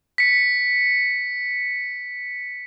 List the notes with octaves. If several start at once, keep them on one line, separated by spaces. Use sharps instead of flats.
B6 C#7